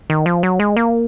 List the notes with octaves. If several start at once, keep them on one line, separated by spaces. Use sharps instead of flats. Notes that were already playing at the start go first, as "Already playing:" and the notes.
D#3
F3
F#3
G#3
A#3